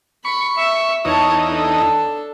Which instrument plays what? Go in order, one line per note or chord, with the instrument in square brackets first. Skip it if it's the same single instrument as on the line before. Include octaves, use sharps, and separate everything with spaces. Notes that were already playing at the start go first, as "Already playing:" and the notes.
[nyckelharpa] B5 [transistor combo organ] C#6
[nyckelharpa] E5
[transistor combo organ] E2 D#4 [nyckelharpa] C#5 A5
[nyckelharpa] D4 A4